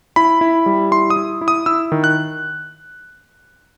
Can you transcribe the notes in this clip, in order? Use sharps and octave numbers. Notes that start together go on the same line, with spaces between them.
E4 B5
E4
G3
E4 C6
D#6
E4
E4
D#6
E4 E6
D#3
F#6